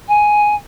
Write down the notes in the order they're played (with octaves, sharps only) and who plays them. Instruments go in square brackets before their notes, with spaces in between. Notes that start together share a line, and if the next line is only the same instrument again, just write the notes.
[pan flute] G#5